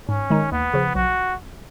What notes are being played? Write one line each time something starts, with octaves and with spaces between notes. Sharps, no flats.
G#2 C#4
D#3 G#3 D#4
D#2 B3
C#3 F3
B1 F#4